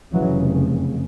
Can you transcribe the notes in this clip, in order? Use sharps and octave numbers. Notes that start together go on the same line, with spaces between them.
F1 F2 C#3 E3 F#3